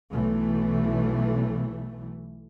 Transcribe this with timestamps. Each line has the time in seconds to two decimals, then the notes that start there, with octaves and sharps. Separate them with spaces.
0.11 B1 E3 A3